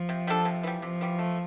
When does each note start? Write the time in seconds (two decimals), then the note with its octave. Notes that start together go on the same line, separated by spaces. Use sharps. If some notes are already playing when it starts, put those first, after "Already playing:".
Already playing: F3
0.09 C3
0.27 G3 D4 A4
0.45 C3
0.63 E3 G3
0.82 C3 F3
1.01 E3 G3
1.19 A3